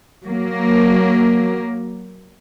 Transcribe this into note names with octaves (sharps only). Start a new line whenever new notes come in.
F#3 A#3